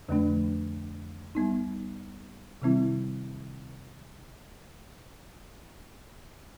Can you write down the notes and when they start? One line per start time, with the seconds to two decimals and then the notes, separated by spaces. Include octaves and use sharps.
0.09 F2 D3 F3 A3 D4
1.35 G3 B3 D#4
2.62 C3 D#3 G3 C4 E4